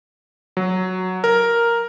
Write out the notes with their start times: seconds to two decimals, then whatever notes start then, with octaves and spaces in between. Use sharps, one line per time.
0.57 F#3
1.24 A#4